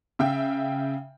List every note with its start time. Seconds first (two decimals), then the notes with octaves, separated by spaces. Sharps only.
0.19 C#3 E5 F5 G5